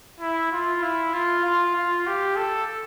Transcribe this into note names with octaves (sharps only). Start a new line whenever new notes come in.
E4
F4
E4
F4
F4
F4
G4
A4